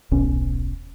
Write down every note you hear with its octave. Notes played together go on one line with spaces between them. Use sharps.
D#1 B1 B2 C#4